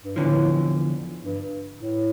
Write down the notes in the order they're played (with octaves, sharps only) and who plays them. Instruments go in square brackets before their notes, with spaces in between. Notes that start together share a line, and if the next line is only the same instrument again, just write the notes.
[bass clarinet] G2
[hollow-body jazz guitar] E2 D3 F3 [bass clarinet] A2
[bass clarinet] G2
A2